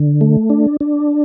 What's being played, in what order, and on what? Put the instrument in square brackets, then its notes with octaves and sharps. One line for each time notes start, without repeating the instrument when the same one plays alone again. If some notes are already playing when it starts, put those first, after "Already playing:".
Already playing: [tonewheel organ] D3
A3
D4
D4